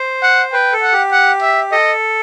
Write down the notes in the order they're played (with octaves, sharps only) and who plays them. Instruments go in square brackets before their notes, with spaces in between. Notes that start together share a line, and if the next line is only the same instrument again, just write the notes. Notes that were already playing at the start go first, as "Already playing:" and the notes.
Already playing: [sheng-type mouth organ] C5
[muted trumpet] F#5
[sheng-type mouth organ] B4 [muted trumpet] G5
[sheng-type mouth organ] A4
[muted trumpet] F#5
[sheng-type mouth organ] G4
[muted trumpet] F#5
E5
[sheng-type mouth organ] A4 [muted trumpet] D#5